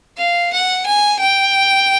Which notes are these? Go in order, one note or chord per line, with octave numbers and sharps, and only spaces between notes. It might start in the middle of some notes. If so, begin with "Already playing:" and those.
F5
F#5
G#5
G5